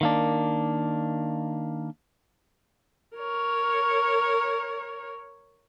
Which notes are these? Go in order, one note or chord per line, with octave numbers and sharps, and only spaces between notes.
D#3 A#3 D4
A#4 C#5